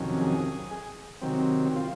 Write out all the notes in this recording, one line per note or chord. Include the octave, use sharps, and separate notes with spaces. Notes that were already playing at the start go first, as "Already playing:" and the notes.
Already playing: F2 C3 D#3 F#3 C#4
G#4
C3 D#3 F#3 C4
F4